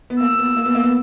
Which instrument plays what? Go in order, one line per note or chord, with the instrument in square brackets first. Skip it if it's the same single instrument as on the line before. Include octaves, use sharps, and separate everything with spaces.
[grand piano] B3
[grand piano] A#3 [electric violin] E6
[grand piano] B3
A#3
B3
A#3
B3